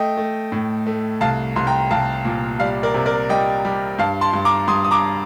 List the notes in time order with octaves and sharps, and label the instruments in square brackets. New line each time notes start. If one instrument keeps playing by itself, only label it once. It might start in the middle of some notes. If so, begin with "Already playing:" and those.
Already playing: [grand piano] A3 D#5 G5
A3
A2
A3
C2 F5 A5
C2 C6
G5 A#5
C2 F5 A5
A#2
G3 D5 F5
A#4 D5
C3
A#4 D5
G3 D#5 G5
G3
G2 F5 A5
A5 C6
G2
A#5 D6
G2 C6 D#6
D#6
A#5 D6